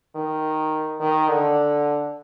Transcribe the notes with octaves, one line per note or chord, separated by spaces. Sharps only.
D#3
D#3
D3